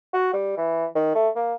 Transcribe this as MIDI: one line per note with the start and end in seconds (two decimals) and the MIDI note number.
0.13 0.31 66
0.33 0.57 55
0.57 0.86 52
0.95 1.13 51
1.15 1.29 57
1.36 1.54 58